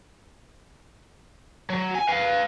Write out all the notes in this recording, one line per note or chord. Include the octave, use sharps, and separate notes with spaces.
F#3
G#5
B4 F5